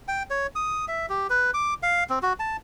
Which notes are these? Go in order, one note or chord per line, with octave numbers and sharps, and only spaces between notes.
G5
C#5
D#6
E5
G4
B4
D6
F5
C4
F#4
A5